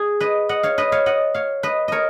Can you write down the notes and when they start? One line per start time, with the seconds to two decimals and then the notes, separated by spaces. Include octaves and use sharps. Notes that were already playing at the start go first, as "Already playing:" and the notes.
Already playing: G#4
0.20 B4 D#5
0.49 D#5 F#5
0.63 C#5 F5
0.78 B4 D#5
0.92 C#5 F5
1.06 D#5 F#5
1.34 C#5 F5
1.63 B4 D#5
1.88 A#4 C#5 D#5